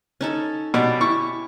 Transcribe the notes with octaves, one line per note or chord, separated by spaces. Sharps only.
C#4 D#4 A4
B2 C#4 G4 D5
E4 C#6